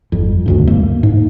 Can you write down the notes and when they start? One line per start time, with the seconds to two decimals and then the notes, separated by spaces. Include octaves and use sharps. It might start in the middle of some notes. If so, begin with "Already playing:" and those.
0.12 G1 F2
0.46 E1 D2 G2
0.67 A3 A#3
1.03 G#2